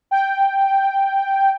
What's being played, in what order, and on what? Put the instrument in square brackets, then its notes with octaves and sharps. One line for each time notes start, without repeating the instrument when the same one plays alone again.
[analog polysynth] G5